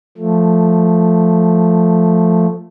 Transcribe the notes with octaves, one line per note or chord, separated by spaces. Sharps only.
F3 A3